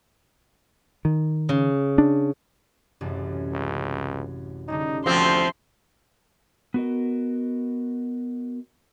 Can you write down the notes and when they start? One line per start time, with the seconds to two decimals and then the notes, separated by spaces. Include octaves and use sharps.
1.05 D#3
1.49 C#3
1.98 D4
3.01 A1 F#2 C3
3.52 C#2
4.68 D3 G3 C#4 D#4
5.06 D2 F3 C4 E5 C6
6.74 B3 F#4 A#4 D#5